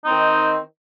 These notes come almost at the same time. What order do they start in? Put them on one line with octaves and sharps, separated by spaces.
D#4 C4 D#3